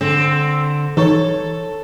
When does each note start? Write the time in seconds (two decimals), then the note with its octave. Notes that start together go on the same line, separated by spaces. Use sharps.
0.01 D3 C4
0.97 E3 D#4 A4 C#5 C#6